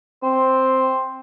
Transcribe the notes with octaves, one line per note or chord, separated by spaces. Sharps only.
C4 C5